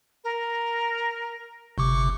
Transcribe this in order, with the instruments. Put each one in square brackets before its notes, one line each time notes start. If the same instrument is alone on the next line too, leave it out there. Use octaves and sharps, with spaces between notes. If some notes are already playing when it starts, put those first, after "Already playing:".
[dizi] A#4
[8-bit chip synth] G1 C3 D6 [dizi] C#6